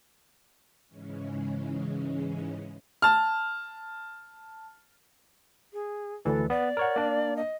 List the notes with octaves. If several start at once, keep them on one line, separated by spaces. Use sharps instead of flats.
G#2 C#3 E3 G#3 C#4
A5 F6
G#4
D2 E3 A4
B3 D5
A#4 C#5 F#5
A#3 D4
D#5